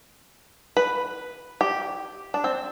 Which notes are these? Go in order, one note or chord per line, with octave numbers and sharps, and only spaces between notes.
B4
G4
D4
C4